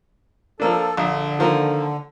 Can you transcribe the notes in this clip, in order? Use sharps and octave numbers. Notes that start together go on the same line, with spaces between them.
F3 A#3 D4 A4
A#1 D3
D#3 F3 A#3